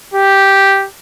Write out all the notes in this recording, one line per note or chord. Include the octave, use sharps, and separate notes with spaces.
G4